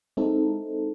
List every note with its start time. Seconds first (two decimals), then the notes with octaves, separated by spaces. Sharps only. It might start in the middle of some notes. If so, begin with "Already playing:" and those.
0.17 G#3 C4 D#4 E4 A4